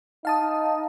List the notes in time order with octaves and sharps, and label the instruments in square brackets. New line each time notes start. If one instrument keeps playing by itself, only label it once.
[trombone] D#4 [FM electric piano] F5 A5 D#6